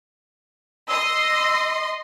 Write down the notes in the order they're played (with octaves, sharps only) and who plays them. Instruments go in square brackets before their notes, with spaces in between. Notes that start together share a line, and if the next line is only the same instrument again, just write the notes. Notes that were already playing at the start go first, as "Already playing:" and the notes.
[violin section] D#5 C6 [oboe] E6